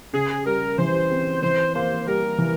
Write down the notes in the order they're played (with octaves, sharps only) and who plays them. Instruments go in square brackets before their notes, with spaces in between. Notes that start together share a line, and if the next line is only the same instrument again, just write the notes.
[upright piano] C#3 [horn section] G#4
[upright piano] G3 [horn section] A#4
[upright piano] E3 [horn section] C5
[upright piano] C4
[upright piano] E3 [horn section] C5
[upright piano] A#3 [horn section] C5
[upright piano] G3 [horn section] A#4
[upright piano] E3